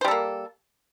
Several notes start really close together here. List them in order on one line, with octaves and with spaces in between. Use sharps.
C5 G3 A4 A#3